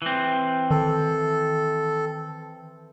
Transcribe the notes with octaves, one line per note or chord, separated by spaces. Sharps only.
E3 C4
D#3 A4